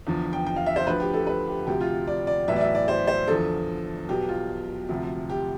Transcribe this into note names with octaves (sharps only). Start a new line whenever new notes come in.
E2 D3 F3
G5
G5
F5
E5
C5
D2 D3 F3 B4
G4
A4
B4
G4
D2 C3 F3 G4
F4
D5
D5
B1 A2 E3 E5
D5
E5
D5
C5
C5
E2 D3 F3 A4
B1 B2 G4
F4
D2 C3 F3
G4